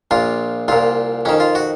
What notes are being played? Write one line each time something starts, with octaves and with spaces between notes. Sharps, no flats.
A#1 A#2 F4
C2 A#2 F4
F2 D#3 C#4
F4
F#4